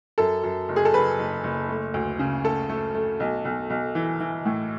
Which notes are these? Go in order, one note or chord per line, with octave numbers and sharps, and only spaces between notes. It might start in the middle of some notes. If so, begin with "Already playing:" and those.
F#2 A4
F#2
F#1
G#4
A4
F#1 B4
F#1
F#1
A3
D2
C#3
A3 A4
A3
A3
B1
B1
B1
E3
E3
A2